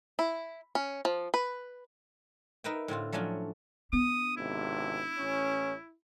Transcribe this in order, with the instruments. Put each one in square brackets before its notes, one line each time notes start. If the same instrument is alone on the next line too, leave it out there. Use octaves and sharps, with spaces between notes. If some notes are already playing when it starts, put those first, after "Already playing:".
[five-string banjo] E4
C#4
F3
B4
[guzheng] D#4 A#4 B4 E5 G5
A2 D3 C4 F4
F3 F#3 A3 C#4 D4 F4
[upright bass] B3 D4 [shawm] D#6
[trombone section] G#1 C#2 C3 [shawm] E4
[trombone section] A1 C#4